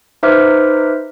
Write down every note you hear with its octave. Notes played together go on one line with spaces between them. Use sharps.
D#4 B4 C5 E5 D6 F6